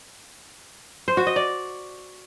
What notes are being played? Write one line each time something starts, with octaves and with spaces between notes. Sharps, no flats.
C5
F#4
D#5
D5